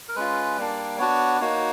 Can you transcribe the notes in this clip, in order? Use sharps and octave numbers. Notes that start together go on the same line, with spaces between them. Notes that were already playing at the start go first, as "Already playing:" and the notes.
A#4
G#3 C#4 F4 B4
G3 A#3 D4
B3 D4 F#4 C#5
A#3 D#4 F#4 C#5